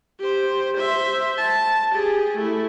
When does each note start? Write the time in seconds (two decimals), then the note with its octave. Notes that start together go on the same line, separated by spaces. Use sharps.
0.20 G4 C5
0.77 C5 E5
1.38 A5
1.92 G4 G#4
2.37 A3 E4